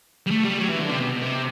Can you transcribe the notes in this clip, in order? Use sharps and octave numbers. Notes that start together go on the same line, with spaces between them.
G3
A3
G3
F#3
E3
D3
C3
B2
C3